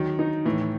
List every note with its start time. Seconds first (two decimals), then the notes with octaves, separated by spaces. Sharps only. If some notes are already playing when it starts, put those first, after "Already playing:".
Already playing: D#3 F#3
0.19 D#4
0.45 A2 E3